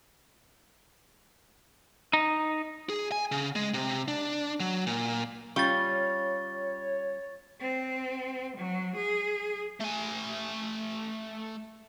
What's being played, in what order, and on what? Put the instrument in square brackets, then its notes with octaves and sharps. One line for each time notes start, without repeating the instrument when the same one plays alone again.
[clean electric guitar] D#4
[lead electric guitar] G#4
G#5
C#3
G#3
C3
D4
F#3
A#2
[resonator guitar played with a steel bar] G3 C#4 F4 [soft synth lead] C#5 [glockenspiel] C#6 A6
[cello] C4
F#3
G#4
[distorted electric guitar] A3 G#5